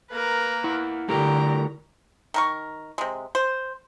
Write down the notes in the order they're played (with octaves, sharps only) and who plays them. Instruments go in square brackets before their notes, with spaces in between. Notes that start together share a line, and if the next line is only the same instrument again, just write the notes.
[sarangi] A#3 [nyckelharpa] A#4 B4
[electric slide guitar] E4 F#5
[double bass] D3 [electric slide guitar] A3 E4 A#4 [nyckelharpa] G4 [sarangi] A#5
[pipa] D#3 A#4 C#6
C3 G#3
C5